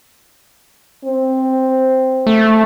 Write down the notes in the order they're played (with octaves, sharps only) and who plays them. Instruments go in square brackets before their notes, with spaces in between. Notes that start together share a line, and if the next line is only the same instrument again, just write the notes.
[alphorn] C4
[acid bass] A3